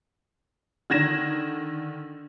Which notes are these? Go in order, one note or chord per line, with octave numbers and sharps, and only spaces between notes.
D3 D#3 G#6 A#6 E7